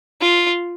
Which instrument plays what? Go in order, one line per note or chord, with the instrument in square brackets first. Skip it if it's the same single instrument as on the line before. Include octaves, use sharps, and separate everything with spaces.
[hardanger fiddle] F4